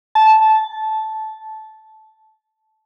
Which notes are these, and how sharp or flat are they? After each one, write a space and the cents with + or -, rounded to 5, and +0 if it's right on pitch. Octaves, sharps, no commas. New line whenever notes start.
A5 -10